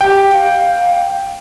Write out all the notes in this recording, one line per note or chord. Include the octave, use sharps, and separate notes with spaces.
G4 G5
F5